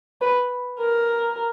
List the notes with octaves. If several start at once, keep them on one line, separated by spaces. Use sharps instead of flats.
B4
A#4